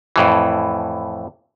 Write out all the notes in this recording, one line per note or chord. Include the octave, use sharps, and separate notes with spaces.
F2 A2 E3